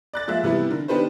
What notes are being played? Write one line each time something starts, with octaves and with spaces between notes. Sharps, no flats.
D5 F#6 A6
F3 G#3 A#3 E5 F#6
C3 E3 G3 B3 E4
D3 A#4
D#3 B3 D4 G4 B4 C5